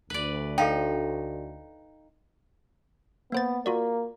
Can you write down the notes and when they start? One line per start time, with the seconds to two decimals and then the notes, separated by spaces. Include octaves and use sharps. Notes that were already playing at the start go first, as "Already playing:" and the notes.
0.10 D2 B4 D5
0.58 D#4 A4 F5 G5
3.32 A#3 B3 C5 A6
3.66 A#3 F4 F#4 D5